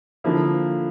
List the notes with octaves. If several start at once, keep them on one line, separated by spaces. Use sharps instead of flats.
D3 F3 A#3 E4